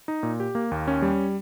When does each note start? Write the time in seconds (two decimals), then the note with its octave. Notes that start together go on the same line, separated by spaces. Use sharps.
0.08 D#4
0.23 A#2
0.40 G4
0.55 A#3
0.71 D#2
0.88 C#4
1.02 G3